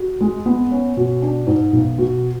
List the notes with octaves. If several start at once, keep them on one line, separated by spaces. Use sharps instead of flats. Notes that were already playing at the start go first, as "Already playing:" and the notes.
Already playing: F#4
G#3
B3
C#4
B2
D4
G#2
B1
B2